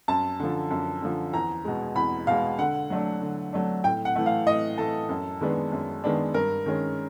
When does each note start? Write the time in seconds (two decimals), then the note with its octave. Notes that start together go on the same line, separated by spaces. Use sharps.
0.08 F#2 A5
0.40 D3 F3
0.71 F#2
1.02 D3 F3
1.33 E2 A#5
1.65 B2 G#3
1.96 E2 B5
2.27 B2 G#3 F5
2.58 D3 F#5
2.90 F#3 A3 D4
3.21 D3
3.53 F#3 A3 D4
3.84 A2 G5
4.05 F#5
4.16 E3 A3
4.26 F5
4.46 A2 D#5
4.78 E3 A3 A4
5.09 F#2
5.41 D#3 G#3 B3 D4
5.72 F#2
6.04 D#3 G#3 B3 D4
6.34 G2 A#4
6.66 D#3 G#3 C#4